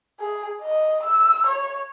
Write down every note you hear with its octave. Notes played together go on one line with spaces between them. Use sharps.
G#4
D#5
E6
C#5